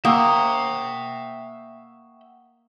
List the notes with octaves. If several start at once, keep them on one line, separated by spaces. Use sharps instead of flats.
A#3 E5 F#5 G5 C#6 D#6 E6